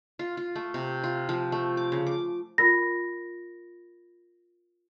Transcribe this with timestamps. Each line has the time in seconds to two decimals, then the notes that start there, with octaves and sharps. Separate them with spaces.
0.19 F4
0.37 F4
0.55 A3
0.74 C3
1.03 F4
1.29 F3
1.52 A3
1.77 D6
1.92 C#3
2.07 D6
2.58 F4 A#4 B5 A#6